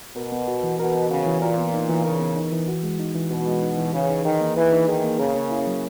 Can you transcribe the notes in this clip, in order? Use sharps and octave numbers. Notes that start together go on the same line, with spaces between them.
B2 A#4
B3
F#4
E3
B2 A#4
B3
C#3 F#4
E3
A#2 A#4
B3
D#4
E3
C#3 A#4
B3
D#4
E3
F#4
G#3
D#4
E3
B2 F#4
G#3
D#4
E3
C#3 B4
D#4
D#3 G#4
A#3
E3 B4
D#4
D#3 G#4
A#3
C#3 A#4
C#4
E4
F#3